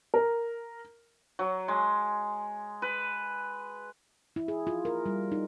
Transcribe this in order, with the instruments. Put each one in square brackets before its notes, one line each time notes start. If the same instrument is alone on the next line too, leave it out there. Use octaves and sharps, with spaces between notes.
[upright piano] A#4
[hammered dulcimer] F#3
G#3
B4
[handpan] E4
G#4
F4
A#4
G3
D#4